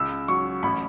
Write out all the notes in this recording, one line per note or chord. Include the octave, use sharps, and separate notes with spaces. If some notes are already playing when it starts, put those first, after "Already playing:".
Already playing: C#2 E6
F#3 C#6
A1 B5